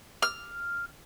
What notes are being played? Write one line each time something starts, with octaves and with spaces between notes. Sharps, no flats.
F6